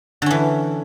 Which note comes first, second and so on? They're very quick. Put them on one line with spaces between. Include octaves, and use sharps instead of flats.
D3 C#4 E3